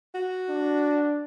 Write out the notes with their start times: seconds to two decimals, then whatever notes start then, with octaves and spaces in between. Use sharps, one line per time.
0.15 F#4
0.50 D4